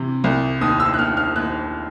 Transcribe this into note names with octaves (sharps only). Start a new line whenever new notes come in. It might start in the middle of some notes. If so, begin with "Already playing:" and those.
Already playing: C3 E3
C2
D#2 D#6
E6
F#6
D#2 F6
F6
D#2 F#6